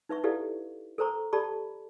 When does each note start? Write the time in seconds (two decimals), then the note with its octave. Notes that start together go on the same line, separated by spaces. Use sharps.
0.09 D#4 B4 E5 C#6
0.24 E4 G4 A4 B4 D5 F5
0.98 A4 A#4 C5 A#5 C#6
1.33 G4 A4 D5 A5 B5 C#6